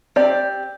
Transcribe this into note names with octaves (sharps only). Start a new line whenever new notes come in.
C4 G4 D5